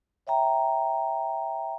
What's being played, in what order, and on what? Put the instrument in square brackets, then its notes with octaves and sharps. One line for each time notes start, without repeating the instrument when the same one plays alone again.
[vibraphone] C#5 E5 G5 A#5